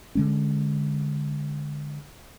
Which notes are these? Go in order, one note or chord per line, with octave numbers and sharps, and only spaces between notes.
D3 G#3 C#4